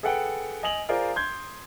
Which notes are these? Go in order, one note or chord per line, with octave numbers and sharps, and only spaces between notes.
G#4 A4 B4 F#5 G5
D#5 G#5 D#6 F7 F#7
F4 G#4 A#4 C5 D5
C6 G6 G#6